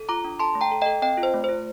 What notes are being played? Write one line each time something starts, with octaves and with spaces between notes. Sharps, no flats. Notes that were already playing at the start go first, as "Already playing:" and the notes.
Already playing: A4
F4 A#5 D6
D4
A4 A5 C6
A3
G5 A#5
A4
D#5 G5
A4
C4 D#5 G5
F4
C5
A3
C5
F4